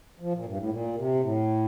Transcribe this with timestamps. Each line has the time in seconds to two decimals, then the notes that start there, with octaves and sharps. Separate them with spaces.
0.20 F3
0.33 A#2
0.45 G2
0.57 A2
0.69 A#2
0.95 C3
1.15 A#2
1.20 A2